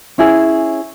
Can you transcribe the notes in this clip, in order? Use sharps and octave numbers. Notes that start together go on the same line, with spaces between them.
C#4 E4 G#4